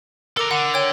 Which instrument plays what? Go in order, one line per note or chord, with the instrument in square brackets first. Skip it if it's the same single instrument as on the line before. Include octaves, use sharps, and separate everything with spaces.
[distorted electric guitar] A4 A#5 [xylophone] A#4 D6
[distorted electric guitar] D3 [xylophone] F#5
[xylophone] C#5 G5